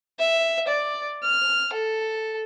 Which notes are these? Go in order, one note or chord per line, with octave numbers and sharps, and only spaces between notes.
E5
D5
F6
A4